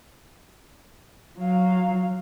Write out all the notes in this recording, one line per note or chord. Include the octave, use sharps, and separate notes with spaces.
F#3 F5